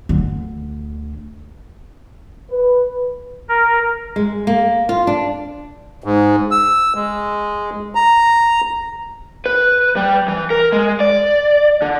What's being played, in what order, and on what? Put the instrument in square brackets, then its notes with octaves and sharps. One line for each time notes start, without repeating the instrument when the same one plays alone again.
[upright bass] D2 D3
[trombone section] B4
[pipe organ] A#4
[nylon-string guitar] G#3
A#3
F4
D4
[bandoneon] G#2
E6
G#3
A#5
[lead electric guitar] B4
G3
E3
A#4
G#3
D5
D3